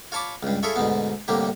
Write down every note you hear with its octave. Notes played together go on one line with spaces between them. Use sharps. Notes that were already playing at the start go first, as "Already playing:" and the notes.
F4 C#5 A5 B5 D6
C#2 G2
E4 F4 G#4 A4 C#5 E5
D2 G#2 B2 B3
C2 A2 D3 A#3 G4